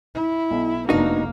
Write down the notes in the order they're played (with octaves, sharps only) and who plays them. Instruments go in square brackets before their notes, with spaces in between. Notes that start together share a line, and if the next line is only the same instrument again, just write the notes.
[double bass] E4
[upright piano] B1
[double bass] F1 A#3 [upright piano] B3 D4 [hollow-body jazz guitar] D#4 F#4